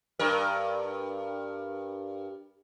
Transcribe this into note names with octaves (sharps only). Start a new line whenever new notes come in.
G2 A#4